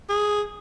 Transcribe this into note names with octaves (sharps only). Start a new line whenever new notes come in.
G#4